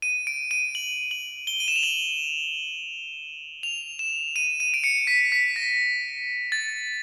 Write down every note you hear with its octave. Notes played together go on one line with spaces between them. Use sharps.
D#7
D7
D#7
F#7
F#7
G7
D#7
E7
F7
F#7
F7
E7
D#7
D#7
D7
C#7
B6
B6
A#6
A6